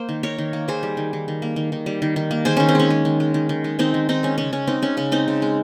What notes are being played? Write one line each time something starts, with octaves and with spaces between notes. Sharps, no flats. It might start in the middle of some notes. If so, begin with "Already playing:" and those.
Already playing: A#3 C5
D#3
D#3 A#4 C#5
D#3
A#3
D#3 G#4 C5
G3
D#3
D#3
D#3
A#3
D#3
D#3
G3
D#3
D#3
A#3
D#3 G#4 C5
D#3 C#4
C4
G#3 C#4
G#3
D#3
G#3
D#3
D#3
G#3
D#3 C4 D#4
D#3
D#3 C4 D#4
G#3 C#4
C#3 C#4
G#3 C#4
G#3 C4 D#4
G#3 C#4
C#3 C#4
G#3 C4 D#4
C#3
G#3